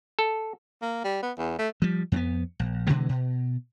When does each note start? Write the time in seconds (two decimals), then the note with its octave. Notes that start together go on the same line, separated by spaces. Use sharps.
0.19 A4
0.82 A#3
1.04 G3
1.23 B3
1.38 E2
1.58 A3
1.82 F3 G3
2.12 F2 A#3 B3
2.59 A#1
2.87 B2 D3 E3 G#3
3.09 B2